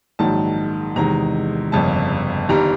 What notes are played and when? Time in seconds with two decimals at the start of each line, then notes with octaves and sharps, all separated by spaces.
0.19 A#1 G#2 D#3 F#3 A5
0.96 E2 C3 D#3 G#3 A#5
1.72 G1 F2 C#3 A5
2.49 G1 G2 D#3 G3 A#5